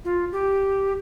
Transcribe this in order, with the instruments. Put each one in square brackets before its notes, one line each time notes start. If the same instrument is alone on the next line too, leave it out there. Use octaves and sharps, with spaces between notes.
[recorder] F4
G4